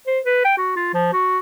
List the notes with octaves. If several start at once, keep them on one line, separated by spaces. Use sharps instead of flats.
C5
B4
G5
F#4
F4
F3
F#4